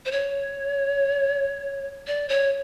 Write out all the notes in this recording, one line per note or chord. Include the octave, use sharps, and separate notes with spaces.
C5
C#5
D5
C#5